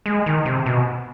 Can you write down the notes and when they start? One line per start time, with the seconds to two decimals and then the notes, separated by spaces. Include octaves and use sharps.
0.06 G#3
0.26 D#3
0.45 C3
0.66 B2